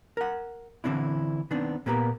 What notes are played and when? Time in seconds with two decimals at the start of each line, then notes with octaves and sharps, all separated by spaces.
0.17 A#4 F#5
0.84 D3 E3 C4 D4 E4
1.51 D#3 B3 C4 D4
1.86 A#2 A#3 B3 G4 A#4